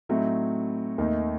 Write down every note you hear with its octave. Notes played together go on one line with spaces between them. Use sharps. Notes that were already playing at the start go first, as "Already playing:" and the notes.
A2 F#3 A3 C4 D#4
D#2 D#3 A3 D#4